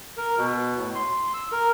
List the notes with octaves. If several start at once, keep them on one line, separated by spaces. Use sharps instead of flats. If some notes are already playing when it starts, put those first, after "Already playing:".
A#4
B2
A2
C6
E6
A#4